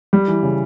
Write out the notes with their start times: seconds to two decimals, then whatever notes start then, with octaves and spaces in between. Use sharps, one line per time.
0.13 G3
0.28 E3
0.43 C#3